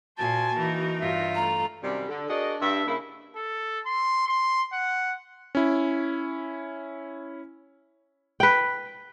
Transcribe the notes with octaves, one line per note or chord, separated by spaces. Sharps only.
A#2 A#3 F#4 C5 G#5 A5
E3 D#4 A#4
G2 F4 E5
A3 A4 A#5
F#2 C3 D#3 G3
D3
D4 F#4 G#4 A#4 D5 D#5
G2 E5
C#3 A#3 E4
A4
C6
C6
F#5
C#4 E4
B4 G5